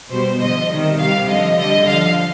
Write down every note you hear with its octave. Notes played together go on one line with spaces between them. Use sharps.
B2 G3 C5
D3 F3 D#5
C3 D#3 G3
C3 D#3 G3 F5
D3 F3 D#5
D3 G3 D#5
D3 F3 F5